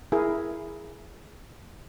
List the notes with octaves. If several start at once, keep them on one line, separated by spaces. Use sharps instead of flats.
E4 G#4 A#4